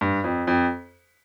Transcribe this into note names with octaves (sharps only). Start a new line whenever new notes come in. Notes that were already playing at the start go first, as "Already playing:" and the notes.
G2
F2
F2